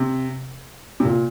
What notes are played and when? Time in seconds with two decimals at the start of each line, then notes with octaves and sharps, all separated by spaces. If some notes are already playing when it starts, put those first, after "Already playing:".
Already playing: C3
1.00 C3
1.05 A#2